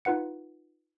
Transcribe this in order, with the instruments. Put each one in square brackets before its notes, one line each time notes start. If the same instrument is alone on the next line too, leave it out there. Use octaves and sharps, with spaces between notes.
[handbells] D#4 F4 B4 F#5 C#7